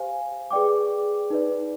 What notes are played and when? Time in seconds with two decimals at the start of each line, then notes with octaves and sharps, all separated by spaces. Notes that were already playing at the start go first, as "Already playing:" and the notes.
Already playing: G4 C5 F5 G#5
0.51 G#4 B4 D5 G5 D6
1.30 D#4 B4 D5